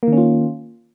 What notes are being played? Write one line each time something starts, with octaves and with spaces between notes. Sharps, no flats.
D#3 A#3 C#4 F4